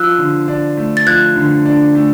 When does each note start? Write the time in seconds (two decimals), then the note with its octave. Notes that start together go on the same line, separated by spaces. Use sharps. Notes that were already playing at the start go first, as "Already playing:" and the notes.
Already playing: F3 E6 F#6
0.18 D3
0.48 D4
0.77 A3
0.97 A6
1.06 F3 F#6 G#6
1.36 D3
1.66 D4
1.95 A3